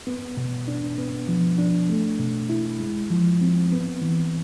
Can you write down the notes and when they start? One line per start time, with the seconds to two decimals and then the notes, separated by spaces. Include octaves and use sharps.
0.07 B3
0.37 B2
0.68 D4
0.98 B3
1.28 F3
1.58 D4
1.90 A3
2.19 B2
2.49 E4
2.80 G#3
3.10 F3
3.41 C4
3.72 B3
4.02 E3